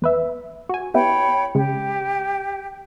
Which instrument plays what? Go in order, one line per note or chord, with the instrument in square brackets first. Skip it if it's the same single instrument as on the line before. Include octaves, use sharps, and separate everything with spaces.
[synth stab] E2 B4 E5
F#4 G#5
[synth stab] B3 E4 G4 [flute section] C#5 G5 B5
[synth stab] C#3 G#3 [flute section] G4